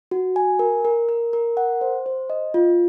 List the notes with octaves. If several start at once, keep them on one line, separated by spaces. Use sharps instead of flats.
F#4
G#5
A#4
A#4
A#4
A#4
F#5
C5
C5
D#5
F4